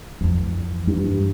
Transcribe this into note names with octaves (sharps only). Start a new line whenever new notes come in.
F2 E3
G2